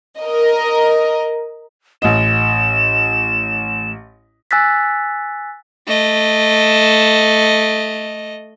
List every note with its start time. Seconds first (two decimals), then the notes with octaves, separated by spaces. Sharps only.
0.19 A#4 D#5
2.02 A1 D#5 E7
4.51 G#5 E6 F#6 A6 B6
5.88 A3 D#5